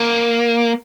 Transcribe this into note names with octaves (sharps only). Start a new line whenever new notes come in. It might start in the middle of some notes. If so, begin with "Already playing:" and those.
Already playing: A#3